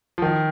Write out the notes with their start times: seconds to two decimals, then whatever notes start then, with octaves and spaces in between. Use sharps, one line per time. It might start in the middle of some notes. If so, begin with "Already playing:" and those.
0.18 F3
0.22 D#3